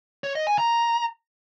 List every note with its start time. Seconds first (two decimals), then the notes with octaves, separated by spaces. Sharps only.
0.24 C#5
0.35 D#5
0.47 G#5
0.58 A#5